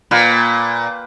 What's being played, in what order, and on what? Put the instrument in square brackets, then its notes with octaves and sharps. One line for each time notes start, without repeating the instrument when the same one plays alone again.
[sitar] A#2 [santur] A#3 B4 G5